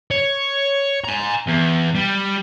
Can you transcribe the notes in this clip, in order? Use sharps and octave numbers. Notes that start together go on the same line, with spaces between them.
C#5
G#5 A#5
E2
G3